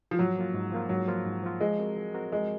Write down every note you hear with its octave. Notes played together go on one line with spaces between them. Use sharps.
F3
G#2 F#3
F3 A#3 F4
G#2
F3 A#3 F4
G#2 F#3
F3 A#3 F4
G#2
F3 A#3 F4
F3 G#3
C4 F#4 A#4
F3
C4 F#4 A#4
F3 G#3